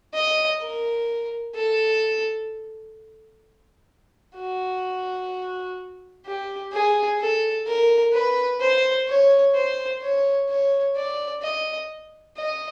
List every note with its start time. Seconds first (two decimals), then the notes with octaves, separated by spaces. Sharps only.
0.14 D#5
0.61 A#4
1.55 A4
4.37 F#4
6.25 G4
6.73 G#4
7.20 A4
7.67 A#4
8.13 B4
8.61 C5
9.07 C#5
9.55 C5
10.01 C#5
10.49 C#5
10.96 D5
11.42 D#5
12.37 D#5